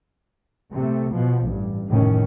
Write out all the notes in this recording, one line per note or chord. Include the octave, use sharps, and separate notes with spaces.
C3 A3
B2 F3
A1 G2
F1 A2 D#3 C#4